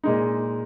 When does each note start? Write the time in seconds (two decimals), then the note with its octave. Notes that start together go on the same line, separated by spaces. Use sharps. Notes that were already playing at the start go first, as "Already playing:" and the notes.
0.04 A#2 G#3 D#4